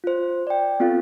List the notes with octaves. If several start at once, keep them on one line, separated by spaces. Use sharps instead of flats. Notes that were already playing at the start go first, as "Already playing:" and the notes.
F4 C5
D5 G5
B3 C4 F4 A4 F5